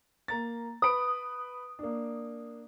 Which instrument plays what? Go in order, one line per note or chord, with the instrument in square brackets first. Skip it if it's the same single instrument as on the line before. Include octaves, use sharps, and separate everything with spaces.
[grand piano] A#3 A#5 A6
[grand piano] B4 B5 D7 [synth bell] D#6
[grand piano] A#3 D4